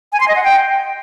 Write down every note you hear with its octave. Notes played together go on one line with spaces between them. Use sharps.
G#5
C6
D#5
F#5
G5